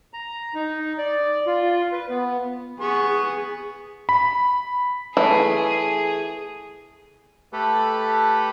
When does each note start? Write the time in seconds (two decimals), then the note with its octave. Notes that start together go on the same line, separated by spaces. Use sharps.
0.14 A#5
0.55 D#4
0.98 D5
1.47 F4
1.92 B4
2.10 B3
2.81 B3 G#4 C#6
4.09 B5
5.17 E3 A3 G#4
7.53 A3 G4 A4 B4